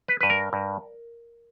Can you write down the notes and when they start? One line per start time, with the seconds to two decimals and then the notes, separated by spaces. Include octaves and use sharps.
0.08 B4
0.21 G2 B4
0.30 A#4
0.53 G2